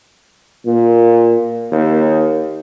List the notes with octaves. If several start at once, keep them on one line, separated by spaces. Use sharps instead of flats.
A#2
D#2